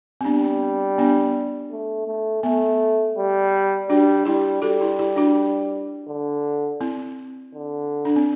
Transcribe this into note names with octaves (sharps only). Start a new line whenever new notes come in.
C4
G3 B3 D4
B3 D4
A3
A3
A3 B3
G3
G3 D4 F#4
G3 E4 G4
G3 F#4 A4
E4 G4
E4 G4
D4 F#4
D3
C4 E4
D3
D4
C4